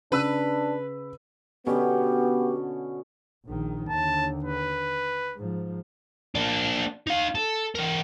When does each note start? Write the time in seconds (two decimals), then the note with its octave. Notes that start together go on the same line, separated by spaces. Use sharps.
0.12 C#3 D4 B4 B5 E6
1.67 B2 D3 B3 C#4 G4
3.46 A#1 D#3
3.89 D#2 D3 A5
4.45 B4
5.36 G#2 F3
6.35 A#3 D4
7.07 D#4 F5
7.35 A4
7.75 E3 A#4